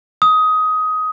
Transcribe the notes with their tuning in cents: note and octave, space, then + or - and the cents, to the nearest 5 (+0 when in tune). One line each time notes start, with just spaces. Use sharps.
D#6 +15